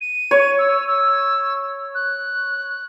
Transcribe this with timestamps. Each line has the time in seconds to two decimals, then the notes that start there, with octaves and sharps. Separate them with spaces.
0.01 D#7
0.31 C#5
0.58 E6
0.87 E6
1.95 F#6